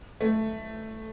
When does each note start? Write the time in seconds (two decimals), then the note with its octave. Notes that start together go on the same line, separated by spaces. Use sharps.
0.21 A3